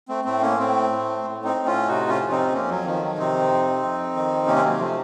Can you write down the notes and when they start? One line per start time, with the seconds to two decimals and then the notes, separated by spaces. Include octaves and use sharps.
0.08 A3 C4
0.25 A2 A3 C4
0.41 A#3 C#4
0.58 A2 A3 C4
0.90 A2
1.23 A2
1.44 C4 D#4
1.55 A2
1.66 C#4 F4
1.88 C3 D#4 F#4
2.09 C#4 F4
2.21 F2
2.30 C4 D#4
2.52 F2 A#3 C#4
2.69 F#3
2.85 D#3 F3
3.02 F#3
3.17 C3 C4 D#4
3.50 F2
3.82 F2
4.15 D#3
4.47 C3 A#3 C#4
4.56 C4
4.64 F#3 A#3
4.79 F3 A3